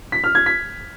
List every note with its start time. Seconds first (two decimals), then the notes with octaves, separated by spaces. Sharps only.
0.12 B6
0.24 F6
0.35 G#6
0.46 B6